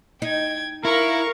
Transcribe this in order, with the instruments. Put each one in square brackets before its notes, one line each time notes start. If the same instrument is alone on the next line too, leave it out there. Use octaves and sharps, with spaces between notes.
[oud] D#4 [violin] G5 G#6
[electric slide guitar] E4 [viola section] A#4 F5 [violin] C#6